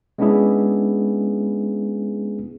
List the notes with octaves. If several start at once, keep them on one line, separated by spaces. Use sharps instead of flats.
G#3 B3 C#4 D4 E4 G#4